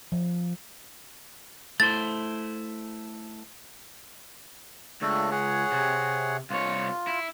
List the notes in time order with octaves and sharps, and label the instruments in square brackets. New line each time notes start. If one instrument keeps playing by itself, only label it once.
[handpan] F3
[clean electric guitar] A3 E4 C5 [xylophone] A6
[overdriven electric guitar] C#2 [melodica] A3 D4 A4
[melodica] G#4 C#5 F#5
[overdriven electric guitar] C3
[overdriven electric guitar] C2 C#5 [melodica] F4
[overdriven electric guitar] E4